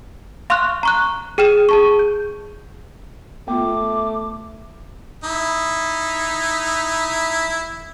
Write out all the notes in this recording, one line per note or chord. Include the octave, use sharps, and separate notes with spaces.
F5 C6 C#6 F6 F#6
A#5 C#6 F#6
G#4 G5 F6 E7
G#4 A5 C#6
G6
A3 B3 F4 D6
D#4 E4